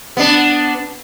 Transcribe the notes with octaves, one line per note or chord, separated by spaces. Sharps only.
B3 D4